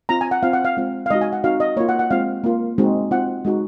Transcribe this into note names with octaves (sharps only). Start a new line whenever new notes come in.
C4 F4 A#5
G#5
F#5
C4 F4 F5
F#5
F5
G#3 C4 F4
F5
G#3 D#4 F#4 D#5
G#5
F#5
C4 D#4 F#4 F5
D#5
A#3 F4 C#5
F#5
F#5
G#3 C4 F4 F5
A#3 F4
G#3 C4 D#4 F#4
C4 F4 F#5
G#3 D#4 F#4